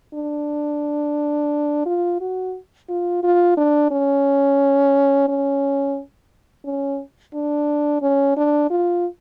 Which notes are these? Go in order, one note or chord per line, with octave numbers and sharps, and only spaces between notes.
D4
F4
F#4
F4
F4
D4
C#4
C#4
C#4
D4
C#4
D4
F4